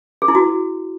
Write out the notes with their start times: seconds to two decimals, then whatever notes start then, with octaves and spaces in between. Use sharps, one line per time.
0.22 G#4
0.28 E4
0.35 F#4